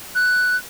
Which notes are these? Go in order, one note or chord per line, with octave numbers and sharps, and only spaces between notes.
F#6